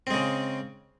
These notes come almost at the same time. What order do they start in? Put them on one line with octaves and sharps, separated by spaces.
C4 G#3 C#3